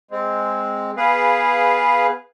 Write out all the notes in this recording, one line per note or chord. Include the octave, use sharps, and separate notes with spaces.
G#3 C4
B3 G#4 B4 F5